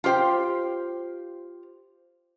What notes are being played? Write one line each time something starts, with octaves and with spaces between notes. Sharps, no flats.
F4 G4 C5 G5